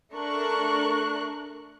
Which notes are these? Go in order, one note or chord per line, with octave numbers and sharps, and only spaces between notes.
A3 D4 A#4 C#6 F#6